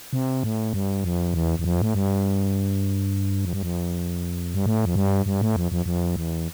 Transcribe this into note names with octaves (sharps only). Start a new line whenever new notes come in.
C3
A2
G2
F2
E2
E2
F2
A2
G2
F2
G2
F2
G2
A2
F2
G2
G2
A2
F2
F2
F2
E2